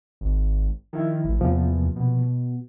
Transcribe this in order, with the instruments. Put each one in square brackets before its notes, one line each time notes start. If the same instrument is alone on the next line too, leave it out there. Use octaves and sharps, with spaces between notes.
[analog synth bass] G#1
[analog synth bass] D#3 [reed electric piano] F3 E4
[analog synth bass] A1
[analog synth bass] E2 [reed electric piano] C3 F3 A#3
[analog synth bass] B2